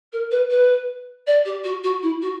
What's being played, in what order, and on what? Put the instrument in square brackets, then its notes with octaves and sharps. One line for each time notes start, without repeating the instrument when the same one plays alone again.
[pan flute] A#4
B4
B4
D5
G4
F#4
F#4
E4
F#4